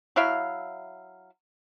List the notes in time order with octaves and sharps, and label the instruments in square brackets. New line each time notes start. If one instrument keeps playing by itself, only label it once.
[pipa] F#3 E4 E5 F5